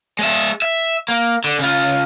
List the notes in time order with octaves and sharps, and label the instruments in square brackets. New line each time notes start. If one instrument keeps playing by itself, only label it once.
[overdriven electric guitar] G#3 E5
E5
A#3
D3
C#3 F4